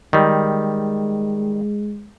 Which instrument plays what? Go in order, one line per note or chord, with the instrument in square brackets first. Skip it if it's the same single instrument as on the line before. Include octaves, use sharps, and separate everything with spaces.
[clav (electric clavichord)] D#3 G3 [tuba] G#3